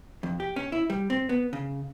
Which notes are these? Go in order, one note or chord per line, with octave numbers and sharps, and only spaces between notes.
F2
G4
C#4
E4
G3
C4
B3
C#3